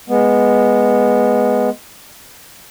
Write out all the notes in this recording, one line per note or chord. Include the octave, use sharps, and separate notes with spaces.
G#3 B3